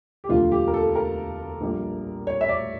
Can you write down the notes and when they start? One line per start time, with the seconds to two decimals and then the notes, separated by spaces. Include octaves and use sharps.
0.24 G4
0.29 E1 D2 D3 F3 F4
0.52 G4
0.68 A#4
0.74 A4
0.95 A#4
1.61 A#1 A#2 G3
2.27 C#5
2.41 E5
2.49 D5